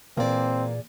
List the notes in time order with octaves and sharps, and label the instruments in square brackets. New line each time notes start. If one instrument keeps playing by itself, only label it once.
[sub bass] A#2 [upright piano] E3 A#3 [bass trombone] C4 [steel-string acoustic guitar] G#4 D5